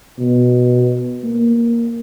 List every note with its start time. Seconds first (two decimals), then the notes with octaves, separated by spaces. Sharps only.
0.19 B2
1.23 A#3